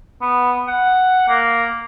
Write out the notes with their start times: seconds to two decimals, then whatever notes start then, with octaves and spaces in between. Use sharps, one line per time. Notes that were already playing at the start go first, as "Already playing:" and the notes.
0.22 B3
0.68 F#5
1.28 A#3